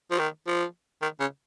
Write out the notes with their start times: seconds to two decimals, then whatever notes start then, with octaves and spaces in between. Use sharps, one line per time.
0.11 F3
0.19 D#3
0.47 F3
1.02 D#3
1.20 C#3